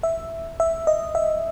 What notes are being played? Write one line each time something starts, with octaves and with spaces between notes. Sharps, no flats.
E5
E5
D#5
E5